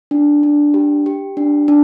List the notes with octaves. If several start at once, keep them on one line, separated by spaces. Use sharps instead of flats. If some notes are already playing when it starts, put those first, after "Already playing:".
D4
D4
G4
G4
D4
D4